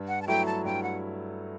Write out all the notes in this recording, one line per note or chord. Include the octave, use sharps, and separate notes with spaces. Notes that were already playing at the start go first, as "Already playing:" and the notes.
Already playing: G2
F#5
A5
F#3 A3 E4 G5
A5
G2 G5
F#5